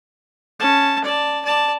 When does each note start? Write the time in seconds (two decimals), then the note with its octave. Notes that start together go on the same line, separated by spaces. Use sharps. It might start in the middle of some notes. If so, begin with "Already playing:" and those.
0.60 C#4 A5
1.04 D5 A5
1.45 D5 A5